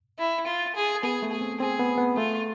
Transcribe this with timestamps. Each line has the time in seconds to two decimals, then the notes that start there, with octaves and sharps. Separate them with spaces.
0.19 E4
0.46 F4
0.76 G#4
1.03 B3 G#4
1.22 A3
1.32 G#4
1.41 C4
1.60 C4 G#4
1.80 B3
1.98 B3
2.17 A3 F4